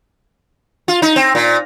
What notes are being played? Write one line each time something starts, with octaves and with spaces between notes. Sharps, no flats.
F4
D#4
C4
A#2